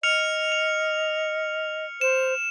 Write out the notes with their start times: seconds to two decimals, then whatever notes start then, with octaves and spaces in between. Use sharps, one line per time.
0.03 D#5 F6 C#7 F7
0.52 F7
2.01 C5 E7